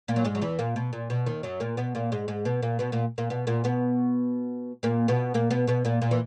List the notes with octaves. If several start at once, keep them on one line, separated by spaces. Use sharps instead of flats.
A#2 A#3
F#3
G#2 G#3
F#3
E2 E3
A#2 A#3
B2
A#2
B2
D#2 D#3
F#2 F#3
A#2 A#3
B2 B3
A#2 A#3
G#2 G#3
G#2 G#3
B2 B3
A#2 A#3
B2 B3
A#2 A#3
A#2 A#3
B2 B3
A#2 A#3
B2 B3
A#2 A#3
B2 B3
A#2 A#3
B2 B3
B2 B3
A#2 A#3
A#2 A#3
E3